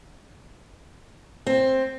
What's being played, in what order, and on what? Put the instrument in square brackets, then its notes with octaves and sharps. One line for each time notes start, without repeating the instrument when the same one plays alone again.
[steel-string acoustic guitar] C4